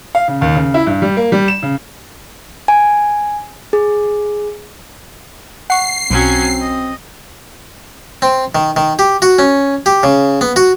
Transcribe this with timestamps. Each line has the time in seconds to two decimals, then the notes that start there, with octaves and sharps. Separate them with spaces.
0.15 F5
0.28 C#3
0.41 D#2
0.55 C#3
0.74 E4
0.87 G2
1.02 G3
1.17 A#3
1.32 G3
1.48 E7
1.63 C#3
2.68 G#5
3.73 G#4
5.70 F#5 C#6 C7
6.10 B1 F#3 C4 C#4
6.60 D#5
8.22 C4
8.55 D#3
8.76 D#3
8.99 G4
9.22 F#4
9.39 C#4
9.86 G4
10.03 C#3
10.41 B3
10.56 F#4